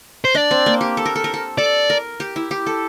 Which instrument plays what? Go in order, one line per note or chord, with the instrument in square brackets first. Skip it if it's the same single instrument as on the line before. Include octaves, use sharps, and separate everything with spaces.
[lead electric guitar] C5
[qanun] D4 [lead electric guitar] D5
[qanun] C4
A#3
G4
A4
A#4
A4
A#4
A4
[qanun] A4 [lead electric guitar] D5
[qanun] A#4
G4
E4
G4
A4